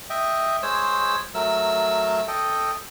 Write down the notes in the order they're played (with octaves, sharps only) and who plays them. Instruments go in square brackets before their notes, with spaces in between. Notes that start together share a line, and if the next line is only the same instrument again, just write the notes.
[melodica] D#5 E5 G5
G#3 C5 C#5 E6
F#3 A3 A#4 E6
A4 D#5 G5